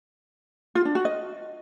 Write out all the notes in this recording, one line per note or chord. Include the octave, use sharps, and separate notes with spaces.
F4
D4
F#4
D#5